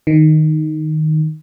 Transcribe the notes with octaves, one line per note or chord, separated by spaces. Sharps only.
D#3